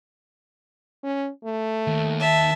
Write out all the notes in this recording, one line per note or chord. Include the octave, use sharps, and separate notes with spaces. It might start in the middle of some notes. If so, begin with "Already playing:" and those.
C#4
A3
D#2
E5 A5